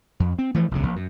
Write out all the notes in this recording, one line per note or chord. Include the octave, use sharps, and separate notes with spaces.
F2
C4
E3 F3 A3
F1 C#2 C#3
A#1
F#2